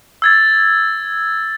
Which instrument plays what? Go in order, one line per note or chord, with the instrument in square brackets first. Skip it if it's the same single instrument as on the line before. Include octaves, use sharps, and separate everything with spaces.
[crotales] E6 G#6 A6